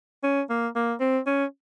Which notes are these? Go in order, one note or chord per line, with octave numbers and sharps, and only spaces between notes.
C#4
A#3
A#3
C4
C#4